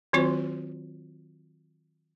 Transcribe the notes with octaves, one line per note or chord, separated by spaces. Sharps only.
D#3 F#3 C4 F4 F#4 C5